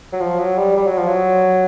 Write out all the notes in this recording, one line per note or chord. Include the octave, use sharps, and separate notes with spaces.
F#3
F3
F#3
G3
G3
F#3
F3
F#3